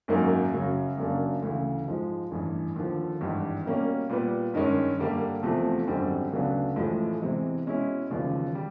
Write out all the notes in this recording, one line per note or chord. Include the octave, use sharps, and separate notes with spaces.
G#1 F#2 D#3 F#3 A#3
F#2 C#3 F#3
F#2 C#3 F#3 A#3 D4
D2 C#3 E3
G#2 F3 G#3
A1 G2 E3
D#2 D3 F3
G#1 G2 E3 G3
B2 G3 A#3 C#4
A#2 G3 B3
G2 D#3 G#3 C#4
G2 D3 G3 A#3
E2 C3 F3 A3
G#1 F#2 D3 G3 C4
D2 C#3 F#3 B3 D4
A1 A2 F3 G#3
E2 C3 E3 G#3
B2 G#3 C#4 E4
E1 D#2 C#3 F3
G3